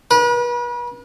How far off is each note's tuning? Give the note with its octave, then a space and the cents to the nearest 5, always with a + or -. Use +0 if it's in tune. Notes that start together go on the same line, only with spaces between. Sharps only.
B4 -40